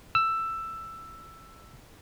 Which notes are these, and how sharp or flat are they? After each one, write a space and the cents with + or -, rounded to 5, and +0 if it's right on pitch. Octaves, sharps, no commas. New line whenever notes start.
E6 +10